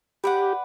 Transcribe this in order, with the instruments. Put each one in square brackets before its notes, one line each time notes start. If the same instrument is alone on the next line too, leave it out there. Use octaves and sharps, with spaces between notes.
[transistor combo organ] G4 [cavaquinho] B4 D5 F#5